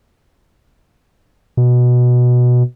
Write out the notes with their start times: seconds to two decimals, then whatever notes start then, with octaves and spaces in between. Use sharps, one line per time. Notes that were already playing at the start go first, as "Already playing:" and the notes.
1.57 B2